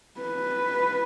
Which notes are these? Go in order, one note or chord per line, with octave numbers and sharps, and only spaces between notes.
B4